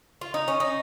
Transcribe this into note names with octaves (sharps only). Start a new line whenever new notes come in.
F4
D#4
C#4
D#4